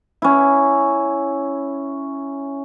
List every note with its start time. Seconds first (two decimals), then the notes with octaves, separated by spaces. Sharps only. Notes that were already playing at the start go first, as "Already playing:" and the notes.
0.22 C#4 E4